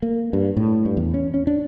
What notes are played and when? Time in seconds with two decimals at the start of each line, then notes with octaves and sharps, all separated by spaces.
0.02 A#3
0.33 G2
0.57 A2
0.85 G2
0.97 E2
1.14 C#4
1.34 C#4
1.47 D4